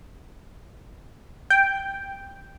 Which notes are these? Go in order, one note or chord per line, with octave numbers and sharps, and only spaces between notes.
G5